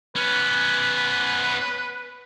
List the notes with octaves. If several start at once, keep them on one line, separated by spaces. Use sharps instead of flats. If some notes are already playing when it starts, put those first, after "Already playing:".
B3 C#4 B4